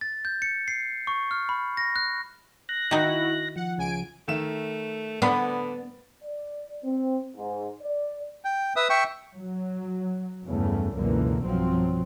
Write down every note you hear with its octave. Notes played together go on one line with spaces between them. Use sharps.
A6
G6
C#7
C7
C#6
F6
B5
A#6
F#6
F#6 A#6
D#3 D#4 E4 F#4
F3 F#5
C#2 G#5 D7
D#3 A3 E5 E7
D3 B3 D5 B5
D5
C4
G#2
D5
G5
B4 E5 D#6
E5 G5 C#6
F#3
E2 G2 C#3 A3
C#2 F#2 B2 D3 E3 A#3
B1 G2 F3 F#3 C4